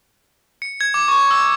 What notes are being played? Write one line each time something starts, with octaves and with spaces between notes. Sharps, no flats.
C#7
G#6
D6
C#6
E6